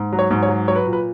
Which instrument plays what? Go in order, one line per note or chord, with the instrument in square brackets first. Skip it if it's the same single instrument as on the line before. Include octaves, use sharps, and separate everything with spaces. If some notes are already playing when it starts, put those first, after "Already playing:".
Already playing: [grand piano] G#2
F#3
C#5
G#2
C#5
F#3
F#3 C#5
B4
A#2
B4